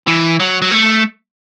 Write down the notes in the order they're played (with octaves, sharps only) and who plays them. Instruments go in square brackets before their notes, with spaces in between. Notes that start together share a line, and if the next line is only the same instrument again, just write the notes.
[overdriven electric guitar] E3
F#3
F#3
A3